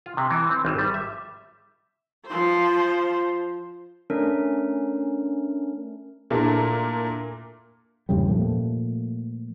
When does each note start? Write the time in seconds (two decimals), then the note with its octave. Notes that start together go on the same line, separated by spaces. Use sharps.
0.06 F4
0.17 C3
0.31 E3
0.50 C4
0.65 G#1
0.78 G3
0.94 E5
2.26 F3 C5
4.10 A3 C#4 D4 A#4
6.30 A#2 A3 D4 E4 A4 A#4
8.09 E2 G#2 C#3 G3
8.28 A#2 F3 A3